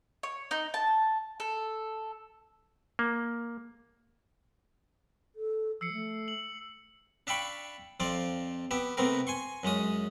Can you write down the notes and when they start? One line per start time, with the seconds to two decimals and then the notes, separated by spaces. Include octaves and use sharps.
0.23 C#5
0.51 D#4
0.74 A5
1.40 A4
2.99 A#3
5.36 A4
5.81 F3 E6 C7 C#7
5.93 A3
6.28 F#7
7.27 D4 E5 F5 G5 B5 C#6
8.00 F2 F3 C4 D5 F5
8.71 B3 G4 E5
8.97 C3 A3 B3 C4 A#4
9.27 G#5 C6 C#6
9.63 F#2 G#3 C#4 D#6